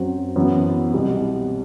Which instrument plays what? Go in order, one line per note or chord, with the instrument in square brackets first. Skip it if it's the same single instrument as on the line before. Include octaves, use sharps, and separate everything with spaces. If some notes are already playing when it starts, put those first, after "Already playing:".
Already playing: [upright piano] F#2 F#3 C4 F#4
F#2 E3 B3
C2 B2 G3